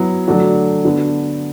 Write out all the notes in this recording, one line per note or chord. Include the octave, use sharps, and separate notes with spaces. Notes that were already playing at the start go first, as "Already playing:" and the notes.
Already playing: F#3 B3 E4
D3 F#3 A3 D4 F#4
D3 B3 D4 F#4 A4